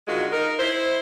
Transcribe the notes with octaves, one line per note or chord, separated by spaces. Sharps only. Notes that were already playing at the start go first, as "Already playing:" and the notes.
D3 D#3 G#3 F4 F#4
D#4 A#4
E4 C5